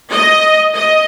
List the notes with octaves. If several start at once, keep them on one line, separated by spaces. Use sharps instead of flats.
D#5
D#5